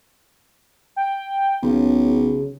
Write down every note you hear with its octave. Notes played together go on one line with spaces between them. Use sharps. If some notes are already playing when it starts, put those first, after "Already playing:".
G5
B1 C#3